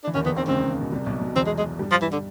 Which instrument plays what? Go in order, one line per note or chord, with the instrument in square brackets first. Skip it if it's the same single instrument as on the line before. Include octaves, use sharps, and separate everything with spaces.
[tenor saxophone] D4
[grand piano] E3
[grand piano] D#2 D#3 [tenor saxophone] C#4
[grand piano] E2 E3 [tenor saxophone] B3
[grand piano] D#2 D#3 [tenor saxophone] C4
[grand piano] C#2 C#3 [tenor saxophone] C4
[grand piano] B2
C2 C3
B1 B2
B1 B2
[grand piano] E2 E3 [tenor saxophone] C4
[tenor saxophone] G#3
G#3
[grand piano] G2 G3
[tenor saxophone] F3
E3
D3